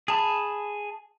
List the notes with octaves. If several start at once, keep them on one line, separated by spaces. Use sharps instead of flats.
G#4 A5 B5